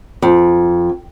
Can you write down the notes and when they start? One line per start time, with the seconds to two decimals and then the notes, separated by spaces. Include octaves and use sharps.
0.22 F2